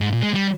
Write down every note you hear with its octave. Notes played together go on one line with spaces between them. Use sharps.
G#2
A#2
G#3
G3